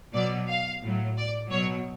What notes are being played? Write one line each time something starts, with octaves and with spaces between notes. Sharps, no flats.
B2 F#3 D5
F5
A2 F#3
D5
B2 F#3 C#5